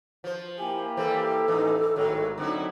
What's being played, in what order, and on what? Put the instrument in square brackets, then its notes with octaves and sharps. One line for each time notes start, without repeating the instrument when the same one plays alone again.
[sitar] F3 C5
[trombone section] A#3 E4 G4 [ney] G#5
[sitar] E3 G3 C4 [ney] A4
[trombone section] A1 A2 D#4 [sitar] E3
[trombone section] G#1 A2 [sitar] D#3 F#3
[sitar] D3 E4 [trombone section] F#3 C4 D#4